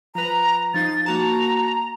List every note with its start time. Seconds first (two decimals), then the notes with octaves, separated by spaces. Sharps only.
0.15 F3 B4 A#5
0.74 F3 D#4 F5 A6
1.06 A#3 F#4 A5 A#5